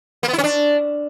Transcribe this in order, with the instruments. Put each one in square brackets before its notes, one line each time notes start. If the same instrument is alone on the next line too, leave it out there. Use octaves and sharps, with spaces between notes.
[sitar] A#3
B3
E4
C#4
D4